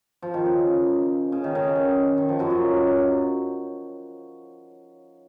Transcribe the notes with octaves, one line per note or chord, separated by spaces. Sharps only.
F3
D#3
C#3
C#3
D#3
C#3
D#3
D#3
F3
F#2 F#3
F#2 F#3